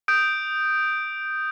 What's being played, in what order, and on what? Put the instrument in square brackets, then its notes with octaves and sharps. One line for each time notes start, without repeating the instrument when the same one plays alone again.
[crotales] D#6 G6 D7